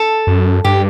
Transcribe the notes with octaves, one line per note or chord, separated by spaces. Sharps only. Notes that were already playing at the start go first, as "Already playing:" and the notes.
Already playing: A4
F#2
G2 G4